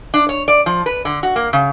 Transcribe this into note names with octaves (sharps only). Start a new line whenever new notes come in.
D4
C#5
D5
F3
B4
D3
F#4
A#3
C#3